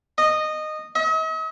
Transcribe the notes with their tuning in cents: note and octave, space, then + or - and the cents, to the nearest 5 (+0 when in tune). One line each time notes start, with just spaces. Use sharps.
D#5 -15
D#5 +45